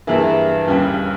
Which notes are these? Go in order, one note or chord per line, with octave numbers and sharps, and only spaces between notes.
G2 E3 A#3 E4 G#4
D#2 C#3 G3